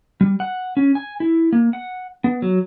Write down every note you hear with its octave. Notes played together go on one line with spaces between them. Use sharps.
G3
F#5
C#4
G#5
E4
A#3
F#5
B3
F#3